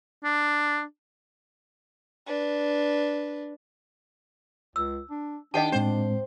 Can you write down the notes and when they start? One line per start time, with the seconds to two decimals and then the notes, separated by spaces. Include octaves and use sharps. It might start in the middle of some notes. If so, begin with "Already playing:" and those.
0.24 D4
2.26 D4 B4
4.76 C#2 E6
5.11 D4
5.54 D#3 D4 G4 D#5 F#5 A5
5.72 A2 G#3 C4 C5